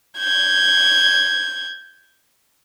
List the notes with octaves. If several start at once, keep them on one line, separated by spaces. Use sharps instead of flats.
G6 G#6